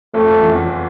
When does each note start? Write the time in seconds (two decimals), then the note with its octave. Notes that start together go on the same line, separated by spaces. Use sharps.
0.14 F2 F3 A3
0.27 F2 F3
0.39 E2 E3
0.51 E2 E3
0.65 F3